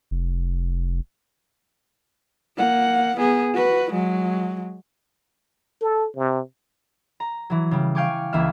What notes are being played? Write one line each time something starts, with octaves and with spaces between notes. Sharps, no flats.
F1
A#3 F#5
B3 G#4
F#4 B4
F#3 G#3
A4
C3
A#5
E3 F#3
C#3 G3
F5 G5 G#5 C#6 D6
C#2 E3 A#3 E5 F6